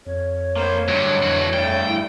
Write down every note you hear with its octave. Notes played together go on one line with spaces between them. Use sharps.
F2 C#5
A#3 C5
G2 D3 F#3
F2 E3 F#4
G2 A3 G5
E4